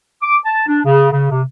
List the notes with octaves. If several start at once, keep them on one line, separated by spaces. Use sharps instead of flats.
D6
A5
D4
C#3
C#3
C3